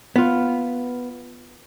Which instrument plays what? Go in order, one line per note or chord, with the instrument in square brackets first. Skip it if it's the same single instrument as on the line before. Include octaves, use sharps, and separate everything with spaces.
[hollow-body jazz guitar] B3 F4